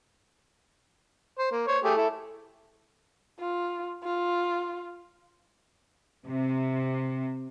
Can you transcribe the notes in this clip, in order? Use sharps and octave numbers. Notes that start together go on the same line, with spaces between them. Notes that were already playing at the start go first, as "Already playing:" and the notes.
C5
A#3
C5 C#5
A3 G4 G#4
E4 A4
F4
F4
C3